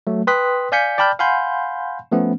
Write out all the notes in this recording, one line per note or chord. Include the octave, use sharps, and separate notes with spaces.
F#3 A3
B4 G5 C6 D#6 F#6 B6
D5 F5 G#5 G6 B6 C#7
D5 G5 A5 B5 F6 G6
F5 F#5 G#5 B5 C6 G6
F3 A3 B3 C#4